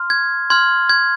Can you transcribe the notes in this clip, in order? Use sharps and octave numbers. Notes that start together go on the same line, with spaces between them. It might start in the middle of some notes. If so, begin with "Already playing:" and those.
Already playing: C6 F6
G#6
C6 F6 G#6
G#6